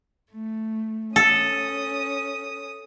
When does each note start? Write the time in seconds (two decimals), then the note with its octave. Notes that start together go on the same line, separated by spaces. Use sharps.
0.31 A3
1.16 C#4 A4 D#6